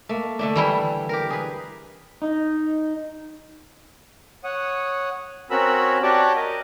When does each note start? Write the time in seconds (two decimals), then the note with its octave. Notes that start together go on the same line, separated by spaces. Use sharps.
0.09 A3 A#3
0.39 D3 A3 D4
0.56 E3 G3 E4
1.09 G4 A#4
1.30 G#4 B4
2.22 D#4
4.44 C#5 F#5 D#6
5.50 C4 C#4 F#4 A#4 B5 E6
6.03 F#4 G4 C#5 D5 A5 D6
6.36 A#4 D#5